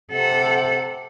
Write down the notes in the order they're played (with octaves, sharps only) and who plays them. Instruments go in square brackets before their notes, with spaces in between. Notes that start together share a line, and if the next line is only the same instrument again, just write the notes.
[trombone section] C3 [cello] A4 F#5